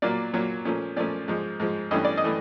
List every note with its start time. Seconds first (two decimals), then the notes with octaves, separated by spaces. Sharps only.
0.02 A#2 F#3 A#3 D5
0.33 A#2 F#3 A#3 C#5
0.65 A#2 F3 A3 C#4
0.96 A#2 F3 A3 C#4 D5
1.28 G#2 F3 G#3
1.60 G#2 F3 G#3
1.91 G2 E3 A3 C#4 D#5
2.05 D5
2.17 D#5
2.24 E3 A3